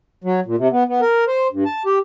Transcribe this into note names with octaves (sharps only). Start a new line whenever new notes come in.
F#3
A#2
C3
B3
B3
A#4
C5
G2
A5
G4